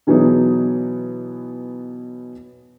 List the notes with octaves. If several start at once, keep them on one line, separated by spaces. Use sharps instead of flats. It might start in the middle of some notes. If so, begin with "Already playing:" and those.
B2 E3 F#3 B3 D#4 G#4